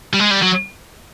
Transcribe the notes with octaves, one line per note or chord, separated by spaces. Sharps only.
G3
G#3
G3
F#3